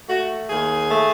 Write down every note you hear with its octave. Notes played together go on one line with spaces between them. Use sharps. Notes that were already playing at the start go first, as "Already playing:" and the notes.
A3 F#4
D#2 G#4
A3